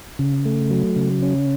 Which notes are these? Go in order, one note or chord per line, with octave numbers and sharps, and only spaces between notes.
C#3
A3
F#3
C#3
C#4